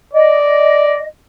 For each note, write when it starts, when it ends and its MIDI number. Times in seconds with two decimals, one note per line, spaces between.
0.13 1.01 74
0.13 1.05 75